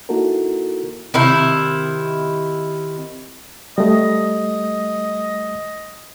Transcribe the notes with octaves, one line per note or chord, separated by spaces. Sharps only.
A#3 D#4 E4 F#4 A4 A#4
C3 D#3 E4
G3 A3 D#5